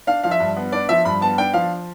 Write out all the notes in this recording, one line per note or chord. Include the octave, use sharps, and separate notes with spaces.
D4 F5
F3 F5
E5
G2
B3
D4 D5
F3 E5
G2 B5
B3 A5
D4 G5
F3 F5